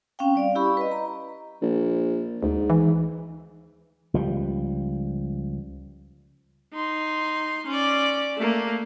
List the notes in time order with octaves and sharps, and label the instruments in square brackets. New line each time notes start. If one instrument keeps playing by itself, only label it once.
[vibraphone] C4 C#4 F5 G5
G3 D5 F5
E4 G4 B5 C#6
B4 D#5
A#5
[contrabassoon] A#1
[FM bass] D2 [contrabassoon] G#2
[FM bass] E3
[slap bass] C#2 F3 G3
[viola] D#4 C6
C#4 D5
A3 A#3